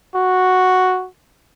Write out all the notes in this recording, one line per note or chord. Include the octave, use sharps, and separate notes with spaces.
F#4